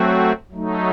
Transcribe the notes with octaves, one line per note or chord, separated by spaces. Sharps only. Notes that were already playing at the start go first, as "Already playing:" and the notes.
Already playing: F#3 A3 C4 F#4
F#3 A3 D#4